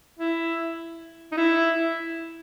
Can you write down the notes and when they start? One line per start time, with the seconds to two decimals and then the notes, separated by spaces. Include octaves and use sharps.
0.19 E4
1.32 D#4
1.37 E4